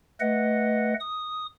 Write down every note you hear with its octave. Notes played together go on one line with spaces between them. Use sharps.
A3 B4 D#5 F#5
D#6